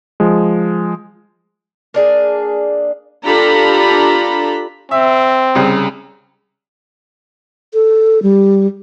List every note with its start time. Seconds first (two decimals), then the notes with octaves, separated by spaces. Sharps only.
0.20 F3 G#3
1.94 A#3 D4 G#4
3.24 D4 F4 G4 A4 A#5 B5
4.91 C4 E5
5.55 C2 C#3
7.74 A4
8.22 G3